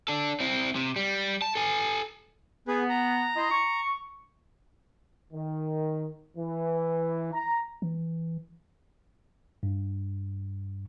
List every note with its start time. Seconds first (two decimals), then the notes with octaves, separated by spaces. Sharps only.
0.08 D4 A4
0.40 C4 E4
0.76 C3
0.96 G3
1.42 A5
1.55 A4 G#5
2.68 B3 G#4 B4
2.89 A#5
3.36 E4 D#5 C6
3.51 C#6
5.33 D#3
6.36 E3
7.34 A#5
7.82 E3
9.63 G2